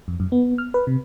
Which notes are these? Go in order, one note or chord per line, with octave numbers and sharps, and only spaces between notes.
F2
F#2
B3
F6
B4
C3